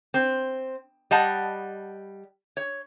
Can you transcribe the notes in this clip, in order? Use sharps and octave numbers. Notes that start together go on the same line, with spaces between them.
C4
G3 D#5 F#5 A5
C#5